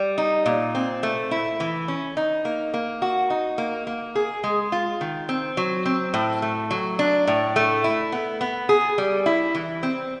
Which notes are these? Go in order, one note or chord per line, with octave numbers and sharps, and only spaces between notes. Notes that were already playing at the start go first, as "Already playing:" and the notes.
Already playing: G3
D#4
A#2
C4
A3
E4
E3
C#4
D#4
A#3
A#3
F#4
D#4
A#3
A#3
G#4
G#3
F4
D#3
C4
F#3
C4
A2
A3
F#3
D4
A2
A3
E4
B3
B3
G#4
G3
E4
E3
C4